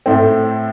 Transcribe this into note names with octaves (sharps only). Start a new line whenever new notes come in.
A2 A3 C4